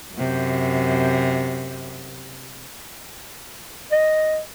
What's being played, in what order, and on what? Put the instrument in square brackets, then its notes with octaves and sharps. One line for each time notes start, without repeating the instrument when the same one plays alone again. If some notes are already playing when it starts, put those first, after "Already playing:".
[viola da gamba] F#2 C3
[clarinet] D#5